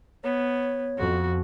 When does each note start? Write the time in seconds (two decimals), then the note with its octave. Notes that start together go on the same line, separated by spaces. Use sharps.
0.24 B3 C#5
0.98 F2 F#4